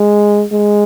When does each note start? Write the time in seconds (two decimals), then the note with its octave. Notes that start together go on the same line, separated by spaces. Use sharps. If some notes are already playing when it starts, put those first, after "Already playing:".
Already playing: G#3
0.52 G#3